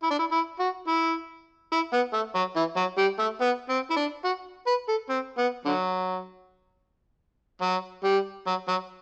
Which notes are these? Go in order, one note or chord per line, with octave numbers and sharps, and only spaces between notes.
E4
D4
E4
E4
F#4
E4
E4
B3
A3
F#3
E3
F#3
G3
A3
B3
C4
E4
D4
F#4
B4
A4
C4
B3
D3 F#3
F#3
G3
F#3
F#3